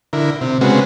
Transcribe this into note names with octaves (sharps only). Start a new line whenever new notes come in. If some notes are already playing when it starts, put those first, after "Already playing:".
D3 E4 A#4
C3
C#3 G#3 B3 C4 F#4